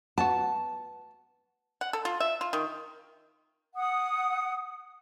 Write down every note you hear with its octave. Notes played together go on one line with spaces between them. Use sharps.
B3 F#4 A5
F#5
A4
F4
E5
F4
D#3
F#5 D#6